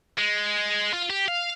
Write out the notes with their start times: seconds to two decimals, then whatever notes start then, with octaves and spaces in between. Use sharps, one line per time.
0.18 G#3
0.93 F4
1.10 G4
1.28 F5